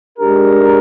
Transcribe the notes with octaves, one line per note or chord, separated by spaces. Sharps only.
G#3 D4 G4 A#4